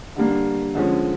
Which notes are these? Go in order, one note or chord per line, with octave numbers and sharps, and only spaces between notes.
D3 G3 A#3 D4
D3 F3 G#3 C#4